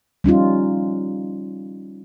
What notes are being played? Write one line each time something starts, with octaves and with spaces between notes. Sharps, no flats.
G3 C#4 D#4 F4